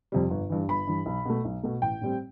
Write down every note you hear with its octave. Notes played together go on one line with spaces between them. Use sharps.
F2 C3 G3
G1
G2 E3
G1 B5
G2 E3
B1
B2 A3
B1
B2 A3
A1 G5
A2 G3 C4